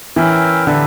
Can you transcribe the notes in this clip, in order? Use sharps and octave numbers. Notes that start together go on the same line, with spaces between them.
E3 C#4 E4 A#4 E5 G5
D3 G4 B4 E5